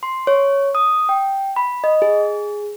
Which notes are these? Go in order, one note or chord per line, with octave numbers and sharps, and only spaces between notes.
C6
C#5
D#6
G5
B5
D#5
G#4